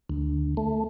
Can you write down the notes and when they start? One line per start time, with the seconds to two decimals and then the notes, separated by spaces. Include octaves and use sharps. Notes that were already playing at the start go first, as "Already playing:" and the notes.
0.10 D2
0.57 A3